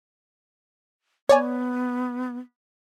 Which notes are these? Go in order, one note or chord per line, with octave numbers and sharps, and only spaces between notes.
B3 C#5 D5 G#5